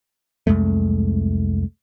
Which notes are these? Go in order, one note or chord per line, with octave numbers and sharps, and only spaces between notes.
C2 F2 G#3 A3